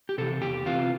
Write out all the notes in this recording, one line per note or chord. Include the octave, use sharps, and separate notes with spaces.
G4
C3 E3 A4
E2 G4
C3 E3 F4